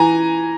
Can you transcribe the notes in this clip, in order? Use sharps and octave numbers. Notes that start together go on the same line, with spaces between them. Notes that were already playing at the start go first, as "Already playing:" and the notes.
Already playing: E3 G#5 A#5